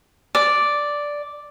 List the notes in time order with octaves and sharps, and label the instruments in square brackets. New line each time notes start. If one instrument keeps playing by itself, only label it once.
[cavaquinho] D5